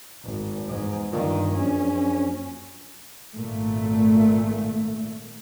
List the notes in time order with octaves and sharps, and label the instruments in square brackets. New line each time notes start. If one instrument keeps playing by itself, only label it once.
[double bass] G#1
E2 G#2
[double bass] G2 D#3 [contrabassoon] A#2
[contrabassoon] A#1 [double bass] F#2 C#4
[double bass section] G#1 A#2 A3